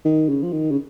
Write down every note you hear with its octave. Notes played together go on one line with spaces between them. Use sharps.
D#3
C#3
F3
D#3
C#3